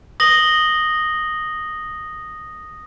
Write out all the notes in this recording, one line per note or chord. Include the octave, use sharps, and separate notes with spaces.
D#6 A#6 F#7 G7